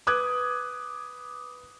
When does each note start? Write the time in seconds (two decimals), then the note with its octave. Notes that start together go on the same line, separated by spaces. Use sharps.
0.07 B4 D6 D#6 F#6 G#6